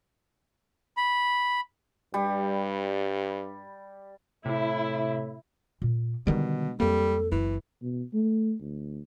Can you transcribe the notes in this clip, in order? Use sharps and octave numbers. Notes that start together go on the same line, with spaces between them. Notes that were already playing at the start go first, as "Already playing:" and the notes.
B5
G2 G3
A2 C3 E4
A#2
B2 D3 D#3 G3 G#3 D4
F2 G3 A#3 A4
F#1 E3
B2
A3
D2